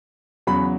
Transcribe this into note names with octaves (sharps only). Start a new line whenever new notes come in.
E2 C#3 F#3 B5